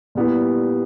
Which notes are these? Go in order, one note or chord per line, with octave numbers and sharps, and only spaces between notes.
A#2 G3 B3 E4 G4